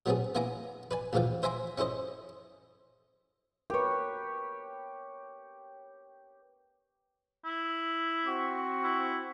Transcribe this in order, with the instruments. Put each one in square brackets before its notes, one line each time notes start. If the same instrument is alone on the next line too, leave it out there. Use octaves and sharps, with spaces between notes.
[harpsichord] F#3 A3 B3 C4 D4 G#4
A#3 B3 E4 G#5 A#5 D6
B4 D5 G#5
D2 G#2 E3 F3 F5 G5
C5 E5 G#5 A#5 C6 D6
C#4 E4 A4 C5 D#5
[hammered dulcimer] G4 C#5 [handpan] A#4 B4
[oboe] E4
[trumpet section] C4 F#4 C#6
[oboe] E4